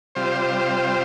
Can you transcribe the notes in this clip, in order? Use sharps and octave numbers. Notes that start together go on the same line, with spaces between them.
C3 G3 F4 C5